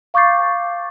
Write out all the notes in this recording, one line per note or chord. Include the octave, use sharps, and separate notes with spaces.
F5 C#6 D6 G6 A6 C7